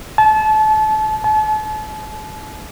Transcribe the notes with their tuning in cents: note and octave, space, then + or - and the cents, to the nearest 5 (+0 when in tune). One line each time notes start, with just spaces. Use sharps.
A5 -30
A5 -40